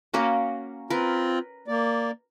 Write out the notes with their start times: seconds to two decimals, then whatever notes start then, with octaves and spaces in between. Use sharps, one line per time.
0.14 A#3 C#4 F#4
0.90 C4 F4 A#4 B4
1.68 A#3 D5